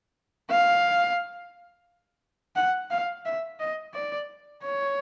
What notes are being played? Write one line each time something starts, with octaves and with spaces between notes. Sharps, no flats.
F5
F#5
F5
E5
D#5
D5
C#5